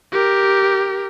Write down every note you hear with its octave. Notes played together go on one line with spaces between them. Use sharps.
G4 A#4